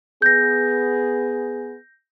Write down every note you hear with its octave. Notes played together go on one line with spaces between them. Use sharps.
B3 G#4 G6 A#6